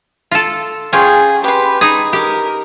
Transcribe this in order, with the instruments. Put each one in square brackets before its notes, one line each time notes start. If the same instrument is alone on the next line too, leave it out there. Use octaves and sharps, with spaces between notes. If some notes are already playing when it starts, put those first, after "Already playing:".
[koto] F4 A4
[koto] C#4 [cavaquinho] F4 G5 C#6 [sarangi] G#4
[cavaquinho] G4 C6 [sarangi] B4
[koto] D#4 G#4 [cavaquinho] D#6
[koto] G4 [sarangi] A#4